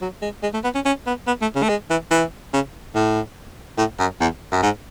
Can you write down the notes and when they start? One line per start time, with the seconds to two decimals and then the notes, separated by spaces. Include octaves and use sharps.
0.01 F#3
0.22 G#3
0.43 G#3
0.54 A3
0.64 B3
0.75 C#4
0.85 C#4
1.07 B3
1.27 B3
1.42 A3
1.56 C#3
1.63 A3
1.69 G#3
1.90 E3
2.11 E3
2.53 C#3
2.95 A2
3.78 A2
3.99 F#2
4.21 E2
4.52 F#2
4.62 G#2